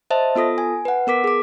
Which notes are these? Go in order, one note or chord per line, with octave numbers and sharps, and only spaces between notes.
C5 D#5 E5 A5
B3 F4 A4 D#6 A#6
G#5
B4 F#5
B3 A#4 D6 B6
G#4 D6